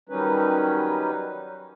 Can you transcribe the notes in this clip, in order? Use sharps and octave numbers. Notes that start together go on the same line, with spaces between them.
D#3 F#3 G3 C#4 D#4 B4